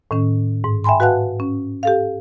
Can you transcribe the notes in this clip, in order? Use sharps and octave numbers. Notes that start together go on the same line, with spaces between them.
A2 D#3 C#4
G#2
E5 G5 G#5 B5 C6
F#4 B4 F5 F#5 A5 F#6
C#4
G4 A4 F5